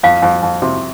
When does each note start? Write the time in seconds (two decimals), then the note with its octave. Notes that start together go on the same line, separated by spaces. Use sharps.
0.03 F2 F5
0.22 F2
0.42 F2
0.62 C3